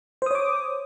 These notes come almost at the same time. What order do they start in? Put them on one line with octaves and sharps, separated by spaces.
C5 D#6 C#5 D6